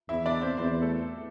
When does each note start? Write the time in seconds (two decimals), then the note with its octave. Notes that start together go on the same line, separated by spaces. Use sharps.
0.09 E2 E4 E5
0.26 D4 D5
0.41 C4 C5
0.58 E2 C4 C5
0.82 A3 A4